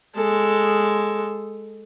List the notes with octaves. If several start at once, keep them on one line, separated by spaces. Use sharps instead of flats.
G#3 A4